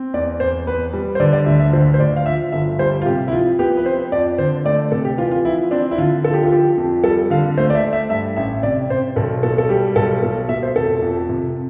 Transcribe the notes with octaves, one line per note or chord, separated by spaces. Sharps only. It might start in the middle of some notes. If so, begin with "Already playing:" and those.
Already playing: C4
E2 D5
E2 C5
B3 B4
G3
C5
D3 D5
D5
D2 E5
E5
D2 C5
C5
D2 D5
F5
F3 E5
G1 E5
G3 C5
F4
C3 G4
E4
F3 F4
B3 G4
B4
C4 C5
F2 D5
D3 C5
A3 D5
C3 A4
G4
E3 F4
F4
F3 E4
C4 D4
E4
D3 F4
F3 A4
G4
F4
F3 G4
F2
G3 A4
D3 F5
A3 C5
D5
E5
A3
E5
G2 E5
A1 E5
C3 D5
C3 C5
B1 A4
B2 A4
A4
G3 G4
B1 A4
B2 A4
B2 E5
C5
F1 A4
F2
C3